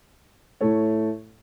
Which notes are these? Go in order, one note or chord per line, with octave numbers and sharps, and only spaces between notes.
A2 A3 E4 A4 C#5